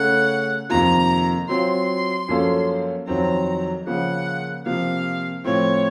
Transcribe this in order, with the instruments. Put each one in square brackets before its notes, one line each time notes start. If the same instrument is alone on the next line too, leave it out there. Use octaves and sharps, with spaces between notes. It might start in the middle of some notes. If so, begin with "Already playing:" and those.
Already playing: [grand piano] C#3 A3 C#4 A4 C#5 [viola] F#5
[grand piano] F2 C3 D#3 A#3 F4 [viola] A#5
[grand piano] F#3 C4 F4 [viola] C6
[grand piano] F#2 F3 A#3 C#4 A4
[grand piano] F2 D#3 F#3 C4 [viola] A#5
[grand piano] C#3 F3 A#3 [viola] F#5
[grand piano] C3 F3 A#3 [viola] F5
[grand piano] A2 F3 C4 [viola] C#5